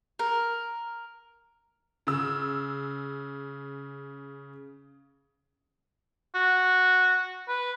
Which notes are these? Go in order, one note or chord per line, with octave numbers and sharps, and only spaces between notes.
A#4
C#3 E6
F#4
B4